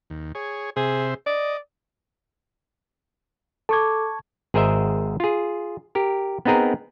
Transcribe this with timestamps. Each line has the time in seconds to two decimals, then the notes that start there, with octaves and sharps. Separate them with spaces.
0.10 D#2
0.35 G#4 C#5
0.76 C3 G#4 C5 E5
1.26 D5 D#5
3.69 A4 A5 C#6 D6 G#6
4.54 G#1 G#4 A#4 C5 D#5 E5
5.20 F4 G#4
5.95 G4 A#4
6.45 B3 C4 D#4 G#4 A#4 B4